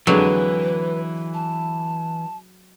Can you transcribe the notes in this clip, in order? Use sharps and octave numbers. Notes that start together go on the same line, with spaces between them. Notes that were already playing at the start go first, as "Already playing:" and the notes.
F2 D3 E3 F#3 G#3 B4
A5